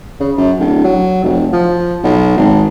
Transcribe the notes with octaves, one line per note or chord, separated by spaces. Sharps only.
C#3
F#2
D1
F#3
F1
F3
B1
G#1